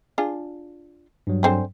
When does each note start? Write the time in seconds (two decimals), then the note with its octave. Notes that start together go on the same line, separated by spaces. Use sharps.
0.18 D4 F4 G#4
1.27 G2 F#3
1.43 D3 C4 G#4